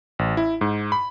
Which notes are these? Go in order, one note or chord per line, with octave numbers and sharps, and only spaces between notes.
A1
E4
G#2
B5